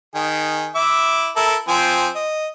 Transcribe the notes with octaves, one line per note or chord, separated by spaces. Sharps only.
D#3 G#4
E4 E5 D6
E4 A4 A#4
F3 C4 G#5
D#5